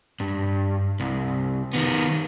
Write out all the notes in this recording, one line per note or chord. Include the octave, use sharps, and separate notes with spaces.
G2
C2
D#3 B3